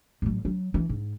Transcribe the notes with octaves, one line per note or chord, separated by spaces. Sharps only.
A1 F#3
F#3
E3
G#2